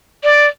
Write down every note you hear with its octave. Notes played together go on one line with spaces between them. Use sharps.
D5